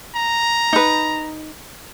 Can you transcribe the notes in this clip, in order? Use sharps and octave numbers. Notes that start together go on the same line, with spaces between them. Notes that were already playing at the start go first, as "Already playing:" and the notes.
A#5
D#4 B4